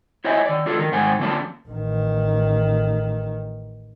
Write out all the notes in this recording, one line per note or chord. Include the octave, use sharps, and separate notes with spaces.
E4 C5 C#5 D#5 E5 G#5
D#3 D5
D4 F4 A4
D#3 A#4
G#2 D#3 C5 F#5 G#5
D3 F3 A#3 C#4 D5 A5
A1 D#3